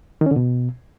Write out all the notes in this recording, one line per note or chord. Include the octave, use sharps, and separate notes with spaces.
D#3
C#4
D3
B2